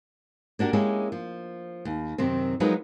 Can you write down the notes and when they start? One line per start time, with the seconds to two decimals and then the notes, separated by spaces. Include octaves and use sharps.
0.59 A#3 D4 F#4 G4 A#4
0.73 G#3 A#3 C#4 E4 G4
1.12 F3
1.85 D#2
2.18 F#2 C3 D#3 C4
2.60 F3 F#3 G#3 D#4 A#4 B4